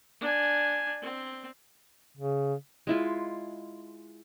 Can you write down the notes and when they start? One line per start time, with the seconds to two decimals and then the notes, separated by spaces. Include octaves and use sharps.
0.21 D4 G#5
1.02 C4
2.17 C#3
2.87 G#3 E4 F4